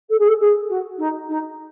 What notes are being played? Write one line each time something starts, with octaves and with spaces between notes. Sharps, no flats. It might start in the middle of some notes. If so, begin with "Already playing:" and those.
A4
G#4
A4
G#4
F#4
D#4
D#4